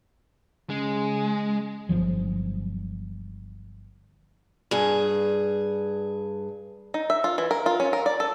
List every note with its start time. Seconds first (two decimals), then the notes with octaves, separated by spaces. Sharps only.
0.70 C#3 G#3
1.89 G1 D2 F3 F#3
4.71 G2 G#4
6.94 D#4
7.10 E5
7.24 F4
7.38 E3
7.51 A#4
7.66 F4
7.80 C#4
7.93 A#4
8.06 D5
8.20 A4